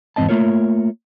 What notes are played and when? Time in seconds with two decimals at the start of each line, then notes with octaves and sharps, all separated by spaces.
0.16 E2 G#2 C3 C4 D#5 A5
0.29 A3 A#3 F4 A#4 C#5